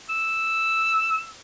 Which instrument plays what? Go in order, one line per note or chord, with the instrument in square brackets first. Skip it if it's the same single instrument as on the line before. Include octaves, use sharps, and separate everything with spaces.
[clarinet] E6